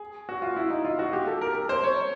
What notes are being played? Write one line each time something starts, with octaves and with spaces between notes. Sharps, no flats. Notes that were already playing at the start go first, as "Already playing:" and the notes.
Already playing: G#4
F#4
F4
E4
D#4
F4
F#4
G4
A4
A#4
A#4
C5
C#5